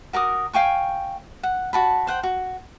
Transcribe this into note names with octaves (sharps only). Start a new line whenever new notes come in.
F#4 A#4 D6 D#6
F5 G5 G#5 C#6
F#5
F#4 A5 B5
C5 F#5 G5
F#4